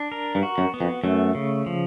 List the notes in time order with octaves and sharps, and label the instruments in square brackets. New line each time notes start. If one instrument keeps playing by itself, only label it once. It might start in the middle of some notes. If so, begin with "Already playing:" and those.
Already playing: [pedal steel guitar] D4
A#4
[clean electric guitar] G2
[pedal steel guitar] F#4
[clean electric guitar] F#2
[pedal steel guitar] B3
[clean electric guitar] F2
[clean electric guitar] F#2 [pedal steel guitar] A3
[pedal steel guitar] C#3
F3